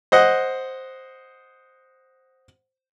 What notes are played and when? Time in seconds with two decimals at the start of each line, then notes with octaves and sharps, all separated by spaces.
0.12 C5 D#5 F#5